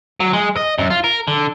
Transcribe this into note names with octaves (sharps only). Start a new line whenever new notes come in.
F#3
G#3
D#5
F#2
F4
A#4
D3